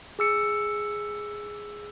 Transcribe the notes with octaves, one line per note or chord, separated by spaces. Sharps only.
G#4 E6 C#7